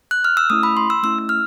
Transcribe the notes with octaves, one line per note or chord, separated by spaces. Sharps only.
F#6
F6
E6
A3 C#4 E4 D#6
B5
C6
E6
A3 C#4 E4 E6
E6
F6